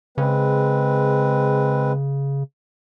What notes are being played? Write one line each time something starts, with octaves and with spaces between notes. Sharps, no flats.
C#3 G#3 C4 B4